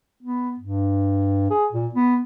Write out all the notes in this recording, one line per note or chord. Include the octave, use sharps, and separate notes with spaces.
B3
G2
G#4
A#2
B3